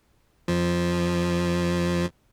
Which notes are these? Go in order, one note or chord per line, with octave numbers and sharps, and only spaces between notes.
F2 F3